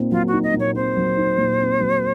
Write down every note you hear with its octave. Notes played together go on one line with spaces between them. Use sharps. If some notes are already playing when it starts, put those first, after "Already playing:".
Already playing: A#2 C4 D#4
F#3 F4
F#4
D#4
D#5
A#2
C#5
C4 C5
F#3
D#4
A#2
C4
F#3